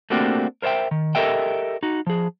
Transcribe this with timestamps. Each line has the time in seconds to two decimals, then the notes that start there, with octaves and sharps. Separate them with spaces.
0.10 A3 A#3 C4 D4 F#4 G4
0.62 A#4 C5 C#5 E5 G5
0.91 D#3
1.15 G4 A4 A#4 D#5 E5 G5
1.83 D#4 F#4
2.07 F3 G#4